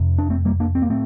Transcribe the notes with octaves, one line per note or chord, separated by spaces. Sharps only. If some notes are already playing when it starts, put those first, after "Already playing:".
Already playing: F2 C3
D4
A3 C4
G3 A#3
A#3 D4
C4
A#3
A2 A3 C4